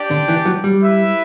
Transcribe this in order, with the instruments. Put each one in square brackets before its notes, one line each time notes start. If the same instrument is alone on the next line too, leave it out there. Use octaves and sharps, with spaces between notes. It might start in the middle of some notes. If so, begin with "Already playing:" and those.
Already playing: [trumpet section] D4 G4 D5 G5
[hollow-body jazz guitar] D3
E3
F#3
G3
[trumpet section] E4 B4 E5